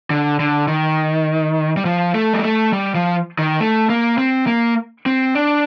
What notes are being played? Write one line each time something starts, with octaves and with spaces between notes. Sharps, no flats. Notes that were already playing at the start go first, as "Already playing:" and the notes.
D3
D3
D#3
G3
F3
A3
G3
A3
G3
F3
D#3
A3
A#3
C4
A#3
C4
D4